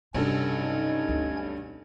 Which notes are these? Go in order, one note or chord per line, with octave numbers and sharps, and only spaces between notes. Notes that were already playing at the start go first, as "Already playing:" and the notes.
B1 G2 C3 C#4 A4 G#6
D#4
D2 C4